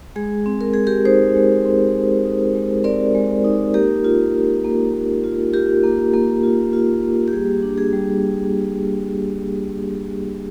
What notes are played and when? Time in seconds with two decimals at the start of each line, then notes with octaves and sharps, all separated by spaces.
0.16 G#3 G#4
0.46 C4
0.61 A#4
0.74 G#3 G#4
0.87 G4 A#4
1.05 D#4 G#4 C5
1.35 G#3
1.65 C4
1.95 G#3
2.25 D#4
2.55 G#3
2.84 C4 A#4 D5
3.15 G#3
3.44 D#4
3.74 A#3 G4 A#4
4.04 F4
4.34 F4
4.64 A#3
4.94 A#3
5.24 F4
5.54 F4 G4 A#4
5.83 A#3
6.13 A#3
6.43 F4
6.73 F4
7.03 A#3
7.28 G4
7.33 G3 G#4
7.63 D4
7.78 G#4
7.93 G3